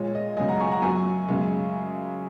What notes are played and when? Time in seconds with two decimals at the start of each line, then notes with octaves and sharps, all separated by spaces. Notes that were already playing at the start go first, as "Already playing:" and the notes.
Already playing: A#2 G#3 C#5
0.15 D#5
0.37 F#2 C#3 G#3 D#5 G#5
0.48 F#5 A#5
0.60 G#5 C#6
0.71 F#5 A#5
0.82 F#2 F#3 G#5 C#6
1.28 F#2 C#3 G#3